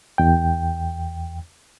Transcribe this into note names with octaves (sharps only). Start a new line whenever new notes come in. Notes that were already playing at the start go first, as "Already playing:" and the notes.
E2 G5